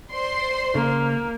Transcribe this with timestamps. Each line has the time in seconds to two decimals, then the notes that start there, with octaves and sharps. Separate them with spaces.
0.11 C5 D5 C6
0.75 C#3 A#3